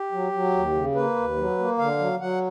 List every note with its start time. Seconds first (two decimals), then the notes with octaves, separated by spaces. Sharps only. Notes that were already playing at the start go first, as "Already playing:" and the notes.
Already playing: G4
0.12 F#3
0.32 F#3
0.54 D#2
0.74 C#3
0.95 A#3 B4
1.16 D#2
1.36 F#3
1.58 A#3
1.78 D3 F5
1.99 F#3
2.20 F#3 F#5